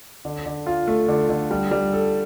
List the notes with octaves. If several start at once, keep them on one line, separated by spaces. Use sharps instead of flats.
D3
D3
F4
A3
D3
D3
G3
G3
A4